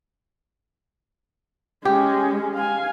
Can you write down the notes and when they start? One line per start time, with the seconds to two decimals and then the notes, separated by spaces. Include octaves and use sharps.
1.85 G#3 C#4 G4
2.55 F5 G#5